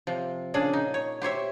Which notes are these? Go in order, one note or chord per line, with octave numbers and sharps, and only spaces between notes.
C3 F3
A#2 C#3 D4 G#4
D#4
C#5
G4 C5 C#5 E5